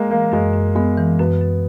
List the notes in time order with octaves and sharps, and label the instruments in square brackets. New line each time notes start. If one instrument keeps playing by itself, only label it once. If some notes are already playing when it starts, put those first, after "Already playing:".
Already playing: [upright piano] G#3 A#3
[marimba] E3 [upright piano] A#3
[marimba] F#2 [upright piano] G#3
[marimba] F#2
[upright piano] G#3 [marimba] B3
[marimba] E3
[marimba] F#2 [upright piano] B3
[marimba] F#2